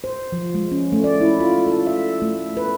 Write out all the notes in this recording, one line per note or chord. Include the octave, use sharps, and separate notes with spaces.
C5
F3
G#3
C#4
A3
D5
E4
F4
A4
E5
A3
B4